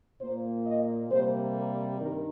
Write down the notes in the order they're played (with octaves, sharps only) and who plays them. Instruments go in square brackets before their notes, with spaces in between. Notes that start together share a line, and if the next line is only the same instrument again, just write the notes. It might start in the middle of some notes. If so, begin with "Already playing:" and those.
[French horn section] A#2 A#3 C5
D#5
C3 G3 A#3 C5
A#4
G2 D#3 A#4